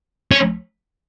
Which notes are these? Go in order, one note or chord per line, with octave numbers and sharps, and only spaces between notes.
C#4